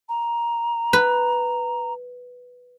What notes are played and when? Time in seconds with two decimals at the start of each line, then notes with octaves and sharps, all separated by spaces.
0.09 A#5
0.93 B4